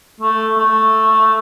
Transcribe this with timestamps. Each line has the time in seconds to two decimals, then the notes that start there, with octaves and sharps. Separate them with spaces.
0.20 A3
0.58 A3